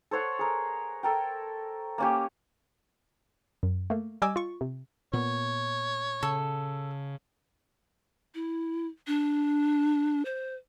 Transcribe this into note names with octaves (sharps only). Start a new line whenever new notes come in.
A4 C5 C#5 F#5
G#4 A#4
A4 A#4 G5
A#3 C#4 G4
F#2
A3 A#3
G3 D#5 G#5 D6 E6 G#6
F4 C#6
C3
A#2 B3 C#5
C#3 A4
E4
D4
C5